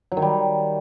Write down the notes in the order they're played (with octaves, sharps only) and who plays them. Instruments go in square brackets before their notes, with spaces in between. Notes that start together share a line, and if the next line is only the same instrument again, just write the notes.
[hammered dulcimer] F#3
D#3
G3